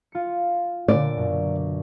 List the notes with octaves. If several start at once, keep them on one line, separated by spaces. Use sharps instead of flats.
F4 C#7
A#2 D3 D5
F#2 B2